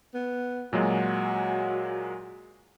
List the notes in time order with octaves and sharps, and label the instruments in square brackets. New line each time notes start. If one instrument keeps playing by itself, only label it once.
[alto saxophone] B3
[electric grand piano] A#2 F#3 G#3 [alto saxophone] F#4